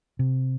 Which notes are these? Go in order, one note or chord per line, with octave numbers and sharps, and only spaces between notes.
C3